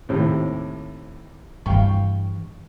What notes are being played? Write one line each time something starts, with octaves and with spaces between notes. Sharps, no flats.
D#2 A2 C3
G2 E3 F5 G5 C#6